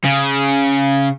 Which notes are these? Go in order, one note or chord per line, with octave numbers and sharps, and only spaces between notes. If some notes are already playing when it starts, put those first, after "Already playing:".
C#3